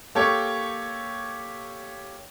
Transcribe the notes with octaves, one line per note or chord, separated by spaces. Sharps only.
A#3 G4 A4 C#5